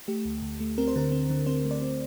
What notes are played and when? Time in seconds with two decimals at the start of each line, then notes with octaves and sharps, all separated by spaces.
0.08 A3 G4
0.25 D2
0.42 D2
0.60 A3
0.78 C4 A#4
0.88 C5
0.96 D3 A#4
1.12 C4
1.30 D3
1.47 C4 C5
1.65 A3
1.71 D5
1.82 C4